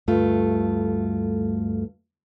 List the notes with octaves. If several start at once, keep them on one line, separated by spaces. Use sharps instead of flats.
D2 G2 A3 F4